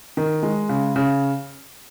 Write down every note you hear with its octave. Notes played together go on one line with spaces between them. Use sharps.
D#3
G#3
C#3
C#3